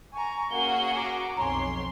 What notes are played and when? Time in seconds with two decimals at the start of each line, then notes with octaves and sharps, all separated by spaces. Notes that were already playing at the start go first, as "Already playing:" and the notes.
0.13 G#5 A#5 C#6
0.51 A#3 C#4 F#4 G#4 G7
0.96 A#5 D6
1.37 B1 F2 C#5 G#5 A#5 C6